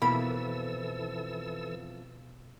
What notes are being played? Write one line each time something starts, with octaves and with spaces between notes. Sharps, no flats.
F2 B2 E3 A#3 E4 A4 B5 E6